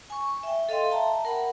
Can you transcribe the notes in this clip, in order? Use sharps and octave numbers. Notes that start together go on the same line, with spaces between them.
G#5 C#6
E5 G5
A4 D#5 F5 G5 C6
E5 G5 A5 A#5
A#4 F#5 B5